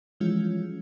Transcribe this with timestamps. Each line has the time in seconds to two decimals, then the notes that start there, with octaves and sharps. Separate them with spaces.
0.20 E3 F3 G3 G#3 C#4 F4